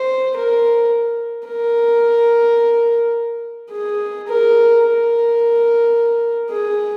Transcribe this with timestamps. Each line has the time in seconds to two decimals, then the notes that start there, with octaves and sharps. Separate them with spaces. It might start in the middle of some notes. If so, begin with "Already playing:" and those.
Already playing: C5
0.36 A#4
1.48 A#4
3.71 G#4
4.27 A#4
4.83 A#4
6.51 G#4